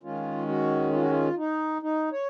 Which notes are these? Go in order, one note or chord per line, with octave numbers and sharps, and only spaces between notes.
D#3 G#3 C#4 F4
F#4
F4
F#4
F4
D#4
D#4
C#5